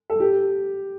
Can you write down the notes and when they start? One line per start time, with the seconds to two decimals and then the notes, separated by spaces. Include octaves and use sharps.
0.10 A4
0.20 G4